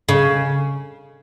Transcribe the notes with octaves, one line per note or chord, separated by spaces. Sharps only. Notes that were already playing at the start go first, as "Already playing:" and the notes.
C#3